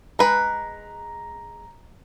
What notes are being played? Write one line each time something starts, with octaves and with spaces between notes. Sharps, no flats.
G#3 B4 A#5